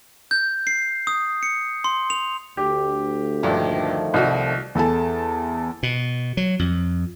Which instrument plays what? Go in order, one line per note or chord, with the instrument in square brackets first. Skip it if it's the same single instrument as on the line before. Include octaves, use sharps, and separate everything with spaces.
[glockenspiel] G6
C7
D#6
C#7
C6
F7
[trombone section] D2 [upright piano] G4
[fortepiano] A#1 G2 [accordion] D#3 F3 A3
[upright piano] C2 [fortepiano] D#4 F#4
[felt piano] E2 A4 G#5 A5
[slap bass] B2
F#3
F2